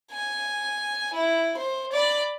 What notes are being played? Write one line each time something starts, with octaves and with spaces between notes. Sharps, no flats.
G#5
E4
C5
D5 B5